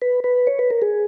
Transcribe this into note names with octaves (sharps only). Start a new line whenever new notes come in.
B4
B4
C#5
B4
A#4
G#4